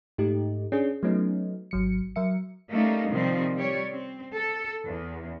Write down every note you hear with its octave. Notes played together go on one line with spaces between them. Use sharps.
G#2 A3 D#4 G4
C#4 D4 G#4
F#3 A3 B3 C#4 D#4
G#1 F#3 C#7
F#3 A#4 E5 C#7
G3 A3 A#3 C#4 D#4
C3 D#3 F3 G3 C4
G3 G4 C#5 D5
C4
A4
E2